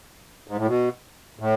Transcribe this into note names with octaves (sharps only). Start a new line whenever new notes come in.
G#2
A2
B2
A2